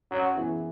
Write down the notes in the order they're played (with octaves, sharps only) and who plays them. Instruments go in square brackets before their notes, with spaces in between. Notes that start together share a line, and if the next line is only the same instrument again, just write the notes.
[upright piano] F#2 [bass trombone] F#3
[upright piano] E3 B3 E4 G#4